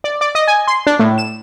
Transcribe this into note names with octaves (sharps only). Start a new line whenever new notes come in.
D5
D5
D#5
G#5
C6
D4
A2
E7